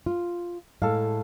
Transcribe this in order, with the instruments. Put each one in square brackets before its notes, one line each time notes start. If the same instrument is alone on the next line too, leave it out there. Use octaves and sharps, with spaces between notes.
[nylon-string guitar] F4
[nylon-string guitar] A2 G#3 [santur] A4 F5